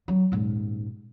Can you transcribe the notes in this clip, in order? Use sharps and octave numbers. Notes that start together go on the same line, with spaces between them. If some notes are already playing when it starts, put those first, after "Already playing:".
F#3
D#1 G#2